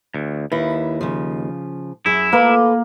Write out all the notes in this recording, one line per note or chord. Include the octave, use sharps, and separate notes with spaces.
D2
D#2 E4 B4
C#3 F3
F#2 E4 G#4
A#3 A4 B4